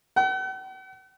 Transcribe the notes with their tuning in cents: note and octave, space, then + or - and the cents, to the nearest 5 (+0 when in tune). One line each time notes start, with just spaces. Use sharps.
F#5 +45